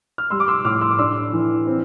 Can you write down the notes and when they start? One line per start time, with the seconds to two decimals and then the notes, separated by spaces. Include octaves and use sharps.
0.18 F6
0.30 G3 C6 E6
0.40 D6
0.48 C6 E6
0.65 A2 D6 F6
0.81 C6 E6
0.91 D6
0.99 D4 C6 E6
1.33 E3
1.67 C4